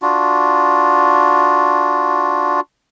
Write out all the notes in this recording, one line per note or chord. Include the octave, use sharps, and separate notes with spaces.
D4 F4 F#4